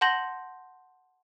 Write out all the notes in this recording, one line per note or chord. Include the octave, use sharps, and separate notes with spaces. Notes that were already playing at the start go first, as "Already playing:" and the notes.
F#5 A5 C6 G6 A#6 F#7